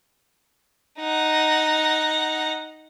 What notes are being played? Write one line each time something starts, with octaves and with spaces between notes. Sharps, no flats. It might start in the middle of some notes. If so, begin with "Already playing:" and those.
D#4 F#5